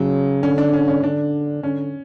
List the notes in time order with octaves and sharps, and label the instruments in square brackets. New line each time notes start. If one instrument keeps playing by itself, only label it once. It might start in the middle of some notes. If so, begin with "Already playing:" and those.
Already playing: [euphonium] C#3 [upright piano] F#3
[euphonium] D3 [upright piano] C#4
[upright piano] D4
C#4
C#4
[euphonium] D3 [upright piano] D4
[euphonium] D3 [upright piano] C#4